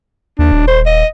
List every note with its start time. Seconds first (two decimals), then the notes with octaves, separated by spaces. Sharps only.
0.39 D#2 D4
0.52 D#1
0.67 C5
0.86 D#5